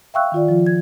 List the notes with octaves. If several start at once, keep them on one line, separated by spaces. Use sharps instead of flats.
E5 F5 G5 C#6 E6 F#6
D#3 F4 D5
F3 F4
G#6